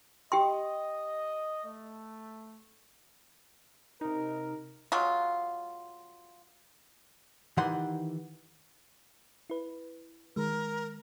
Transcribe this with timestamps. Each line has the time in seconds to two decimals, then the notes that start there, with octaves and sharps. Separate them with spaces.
0.32 G4 D#5 G5 C6
1.65 A3
4.01 C3 D#4 A#4
4.92 F#3 G#3 F4
7.57 D#3 E3 G4 F#5 C6
9.50 E4 B4
10.36 D#3 G#3 A#4